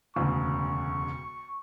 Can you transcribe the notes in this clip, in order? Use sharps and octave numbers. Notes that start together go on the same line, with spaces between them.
E1 D2 C#3 C#6